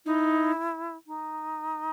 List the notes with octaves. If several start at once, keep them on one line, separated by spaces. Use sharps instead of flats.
D#4 E4
D#4